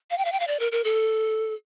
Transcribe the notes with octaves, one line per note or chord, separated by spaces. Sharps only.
F5
G5
F5
G5
F5
D5
A#4
A#4
A4